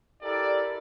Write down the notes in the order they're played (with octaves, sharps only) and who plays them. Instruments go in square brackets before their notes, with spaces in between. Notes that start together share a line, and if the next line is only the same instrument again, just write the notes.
[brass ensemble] E4 G4 A4 A#4 D5